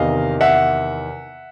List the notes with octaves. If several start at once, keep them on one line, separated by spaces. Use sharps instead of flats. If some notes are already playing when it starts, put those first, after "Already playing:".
Already playing: E2 C3 D#3 D#5 F5
E5 F#5